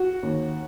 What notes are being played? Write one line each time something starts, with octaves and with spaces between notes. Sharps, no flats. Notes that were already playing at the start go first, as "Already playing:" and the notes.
Already playing: F#4
D#2